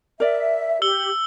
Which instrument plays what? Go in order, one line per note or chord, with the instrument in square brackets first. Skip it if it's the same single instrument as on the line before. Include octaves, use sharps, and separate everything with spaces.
[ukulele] A#4 D5 [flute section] E5
[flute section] G4 [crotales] E6 G7